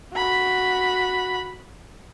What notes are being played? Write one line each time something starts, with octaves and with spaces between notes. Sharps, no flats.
F#4 B5